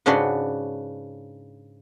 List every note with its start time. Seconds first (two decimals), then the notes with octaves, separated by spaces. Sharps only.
0.06 G#2 C#3 D4 F#4 B4 C6